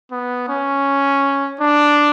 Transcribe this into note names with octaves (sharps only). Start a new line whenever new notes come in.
B3
C#4
D4